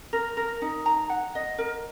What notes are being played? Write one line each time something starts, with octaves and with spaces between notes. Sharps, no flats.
A#4
A#4
D#4
A#5
F#5
D#5
A#4